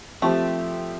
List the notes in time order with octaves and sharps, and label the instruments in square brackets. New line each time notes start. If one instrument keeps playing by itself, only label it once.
[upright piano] F3 C4 G4 [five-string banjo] A3